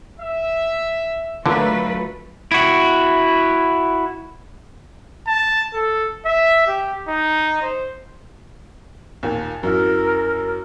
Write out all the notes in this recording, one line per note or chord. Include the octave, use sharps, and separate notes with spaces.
E5
D2 D3 F#3 A3 F4 A#4 B4
E4 F#4
A5
A4
E5
G4
D#4
C5
D#2 A#2
F#2 E4 A#4